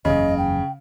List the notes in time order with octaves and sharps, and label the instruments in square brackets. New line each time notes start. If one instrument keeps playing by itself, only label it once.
[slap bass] F#1 E2 [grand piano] C#3 [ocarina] D#5
[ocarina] G5